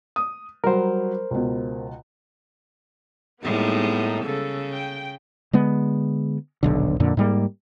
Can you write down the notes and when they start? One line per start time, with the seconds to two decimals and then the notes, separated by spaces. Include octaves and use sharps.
0.16 D#6
0.64 F#3 G3 A#4 C5
1.31 C#2 B2
3.43 A2 G3 G#3 A#3 B3 D#4
4.24 C#3 A4
4.72 G5
5.53 D3 G#3 B3
6.63 D#1 B1 D3
7.00 F2 A#2 D3
7.17 G#2 G3 A#3